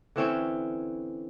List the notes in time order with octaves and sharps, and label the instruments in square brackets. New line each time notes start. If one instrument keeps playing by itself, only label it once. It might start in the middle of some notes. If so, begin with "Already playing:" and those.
[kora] D3 E3 C4 C#4